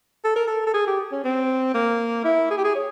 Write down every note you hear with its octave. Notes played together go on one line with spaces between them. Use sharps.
A4
A#4
A4
A4
G#4
G4
C#4
C4
A#3
E4
G#4
G4
G#4
C#5